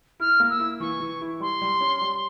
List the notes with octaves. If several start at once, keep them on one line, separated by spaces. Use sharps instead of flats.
E4 F6
A#3
E6
E4
E3 C#6
E3
E4
G3 C6
G3
C#4
G3